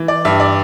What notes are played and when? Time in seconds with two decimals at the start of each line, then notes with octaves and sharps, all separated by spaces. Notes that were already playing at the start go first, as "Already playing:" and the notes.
Already playing: E3
0.08 D5
0.25 G2 E5
0.40 D5